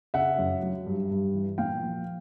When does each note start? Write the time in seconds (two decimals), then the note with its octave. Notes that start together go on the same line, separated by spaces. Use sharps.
0.14 C#3 E5 F#5
0.38 F#2
0.63 F#3
0.86 G2
1.11 G2
1.35 E3
1.58 A#2 F5 G5
1.83 F3